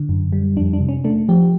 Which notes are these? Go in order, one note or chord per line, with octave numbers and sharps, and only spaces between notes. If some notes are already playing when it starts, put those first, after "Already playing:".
Already playing: D3
F#2
G3
F2 D4
D4
C3
C#4
A3 D4
F3 G4